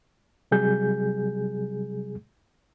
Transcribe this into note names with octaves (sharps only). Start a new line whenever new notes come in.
C3 F#3 G3 G#4 G6